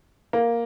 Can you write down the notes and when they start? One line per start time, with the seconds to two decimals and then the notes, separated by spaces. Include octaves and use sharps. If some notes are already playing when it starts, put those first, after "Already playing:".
0.33 A#3